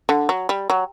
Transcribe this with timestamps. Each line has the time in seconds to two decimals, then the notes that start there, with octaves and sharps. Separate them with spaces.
0.09 D3
0.29 F#3
0.49 G3
0.70 F#3